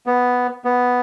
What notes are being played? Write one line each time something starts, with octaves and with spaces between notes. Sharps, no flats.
B3
B3